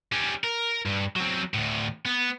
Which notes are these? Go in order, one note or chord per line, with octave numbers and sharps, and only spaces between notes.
G3 C#4
A#4
G2
F#3 C4
D2 A2
B3